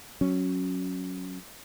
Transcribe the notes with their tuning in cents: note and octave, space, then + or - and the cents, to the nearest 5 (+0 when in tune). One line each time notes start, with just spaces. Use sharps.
F#3 +0 C#4 +0